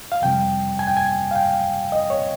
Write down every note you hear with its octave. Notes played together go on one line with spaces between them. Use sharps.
F5
F2 C3 G3 G5
G#5
G5
G#5
F5
G5
D#5
C#5